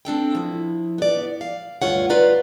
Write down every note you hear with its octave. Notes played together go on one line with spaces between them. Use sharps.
C4 D4 A4 G5
F3 E4
B3 D5
F5
D2 G2 F4 C#5 F#5
F4 B4 D5 A#5